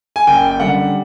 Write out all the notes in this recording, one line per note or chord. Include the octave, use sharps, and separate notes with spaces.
G#5
F#1 G5
G5
F#2 D3 G3 F#5